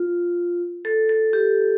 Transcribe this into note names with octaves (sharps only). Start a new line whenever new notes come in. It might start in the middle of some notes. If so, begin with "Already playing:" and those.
Already playing: F4
A4
A4
G4